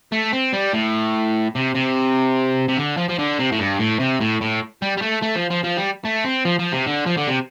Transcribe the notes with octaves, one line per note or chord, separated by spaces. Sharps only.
A3
C4
G3
A2
C3
C3
C3
D3
F3
F3
D3
C3
A2
G2
A2
C3
A2
A2
G3
G3
A3
A3
F3
F3
F3
G3
A3
C4
F3
F3
C3
D3
F3
D3
C3